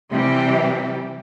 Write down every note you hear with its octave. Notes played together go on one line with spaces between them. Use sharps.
C3 E3 G3 G4